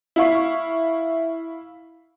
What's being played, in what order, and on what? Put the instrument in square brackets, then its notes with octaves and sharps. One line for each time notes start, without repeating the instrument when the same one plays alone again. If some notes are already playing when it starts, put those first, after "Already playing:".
[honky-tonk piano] E4 F5 C#6